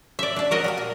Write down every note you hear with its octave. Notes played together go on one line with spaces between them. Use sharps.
D5 E5
D4 D5 A5
F#4 A#4 D#5
F#3 G3 F5
A#2